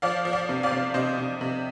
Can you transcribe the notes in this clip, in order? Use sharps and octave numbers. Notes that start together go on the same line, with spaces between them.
F3 D5 F5
F3
D5 F5
C3
D5 F5
C3
C3 C5 D#5
C3
C3